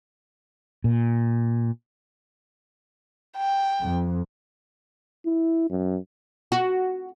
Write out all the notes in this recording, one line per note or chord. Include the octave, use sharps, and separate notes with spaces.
A#2
G5
F2
E4
F#2
F#4